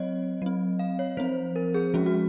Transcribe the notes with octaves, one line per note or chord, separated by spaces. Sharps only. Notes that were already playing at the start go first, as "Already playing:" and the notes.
Already playing: F#3 C4 C#5 D#5
F#3 C4
F5
C#5
F3 C4 C5
A#4
G#4
F3 G#3 C#4 F#4
F#4